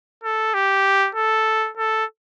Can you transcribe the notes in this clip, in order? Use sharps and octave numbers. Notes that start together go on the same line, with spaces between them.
A4
G4
A4
A4